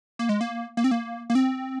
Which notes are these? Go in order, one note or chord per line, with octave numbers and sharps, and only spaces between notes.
A#3
G#3
A#3
A#3
C4
A#3
A#3
C4